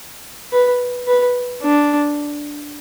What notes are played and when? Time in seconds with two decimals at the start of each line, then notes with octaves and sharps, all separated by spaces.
0.52 B4
1.07 B4
1.62 D4